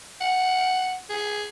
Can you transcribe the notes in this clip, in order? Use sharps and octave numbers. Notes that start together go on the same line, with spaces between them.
F#5
G#4